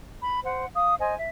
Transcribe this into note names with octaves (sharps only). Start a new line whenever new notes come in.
B5
C5 F#5
F5 D#6
C5 D#5 G#5
E5